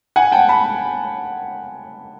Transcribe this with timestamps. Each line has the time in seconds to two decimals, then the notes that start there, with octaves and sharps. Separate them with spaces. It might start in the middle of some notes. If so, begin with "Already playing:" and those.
0.16 F#5 G#5
0.32 G5 A5
0.49 A5 B5